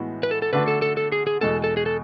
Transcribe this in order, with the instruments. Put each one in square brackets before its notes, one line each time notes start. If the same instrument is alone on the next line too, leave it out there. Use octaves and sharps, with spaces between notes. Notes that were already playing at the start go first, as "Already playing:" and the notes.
Already playing: [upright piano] A2 E3 G#3 B3 F#4
[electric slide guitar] B4
A4
A4
[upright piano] D3 A3 D4 F#4 [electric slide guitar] B4
[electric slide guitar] A4
A4
A4
G#4
G#4
[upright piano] E2 B2 G#3 [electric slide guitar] A4
[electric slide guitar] A4
G#4
A4